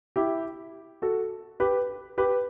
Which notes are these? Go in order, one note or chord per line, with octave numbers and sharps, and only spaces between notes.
E4 G4
F#4 A4
G4 B4
G4 B4